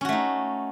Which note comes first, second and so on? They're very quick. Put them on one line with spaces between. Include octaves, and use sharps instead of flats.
C#4 F#4 A3 D#4